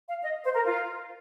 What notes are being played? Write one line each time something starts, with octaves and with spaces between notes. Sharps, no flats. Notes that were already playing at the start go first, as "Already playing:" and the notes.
F5
D#5
C5
A#4
F4